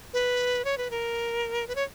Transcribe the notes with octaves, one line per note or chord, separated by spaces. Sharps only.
B4
C#5
B4
A#4
B4
C#5